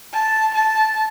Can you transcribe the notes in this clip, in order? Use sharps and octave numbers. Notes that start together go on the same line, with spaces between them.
A5
A5